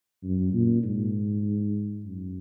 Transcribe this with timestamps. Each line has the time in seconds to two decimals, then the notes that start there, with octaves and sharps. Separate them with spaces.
0.24 F#2
0.53 A#2
0.84 G#2
2.05 F#2